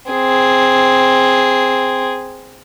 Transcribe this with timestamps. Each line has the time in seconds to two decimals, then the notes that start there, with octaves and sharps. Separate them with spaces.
0.11 C4 G#4